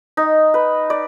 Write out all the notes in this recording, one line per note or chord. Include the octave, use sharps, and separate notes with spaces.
D#4
B4
D5